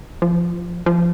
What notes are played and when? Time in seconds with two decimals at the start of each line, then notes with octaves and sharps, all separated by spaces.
0.22 F3
0.86 F3